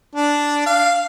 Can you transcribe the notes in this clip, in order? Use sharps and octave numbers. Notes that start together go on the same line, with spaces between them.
D4
F5